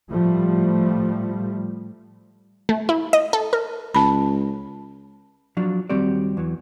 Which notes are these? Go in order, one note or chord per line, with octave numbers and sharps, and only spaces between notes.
A2 F3 G3 A3
A3
E4
D#5
A4
A#4
C#2 A5 B5
F3 F#3 D4 F4
D#2 G3 C4 F#4 G4 D5
E2 E3 F#3